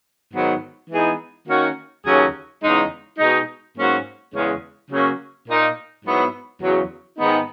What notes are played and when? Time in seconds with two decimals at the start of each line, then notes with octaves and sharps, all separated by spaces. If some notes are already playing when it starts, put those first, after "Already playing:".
0.33 G#2 D#3 F#3 B3 F#4
0.90 E3 G#3 B3 D#4 G#4
1.48 D#3 A#3 C#4 F#4
2.05 D#2 C#3 F#3 C#4 G#4
2.62 E2 C#3 G#3 D#4
3.19 B2 G#3 D#4
3.77 G#2 F#3 A#3 C#4 F#4
4.34 E2 C#3 G#3 C#4
4.91 C#3 F#3 A#3 C#4
5.47 A#2 A#3 D#4
6.05 G#2 F#3 B3 E4
6.61 E2 C#3 F#3
7.18 G#2 D#3 G#3 B3 D#4